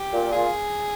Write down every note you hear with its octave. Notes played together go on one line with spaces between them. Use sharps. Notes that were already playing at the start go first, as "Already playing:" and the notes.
Already playing: G4
A#2
F4 G#4